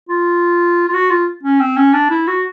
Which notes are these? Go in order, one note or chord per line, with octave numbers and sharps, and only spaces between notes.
F4
F4
F#4
F4
C#4
C4
C#4
D4
E4
F#4